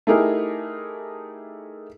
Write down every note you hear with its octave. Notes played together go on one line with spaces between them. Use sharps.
A3 D#4 E4 G4 G#4 A#4